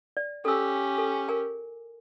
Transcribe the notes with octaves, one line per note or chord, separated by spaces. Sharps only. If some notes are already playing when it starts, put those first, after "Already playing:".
D5
C#4 G4 A4 E6
A4
A#4 G#5